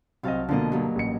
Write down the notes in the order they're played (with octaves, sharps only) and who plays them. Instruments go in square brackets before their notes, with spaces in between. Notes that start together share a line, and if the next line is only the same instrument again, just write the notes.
[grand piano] C2 C4 D#5 [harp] F#3 F5 A5
[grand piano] B2 D3 [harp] F3 A#3 D#5
[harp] G2 F#3 A#3
[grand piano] A1 C#7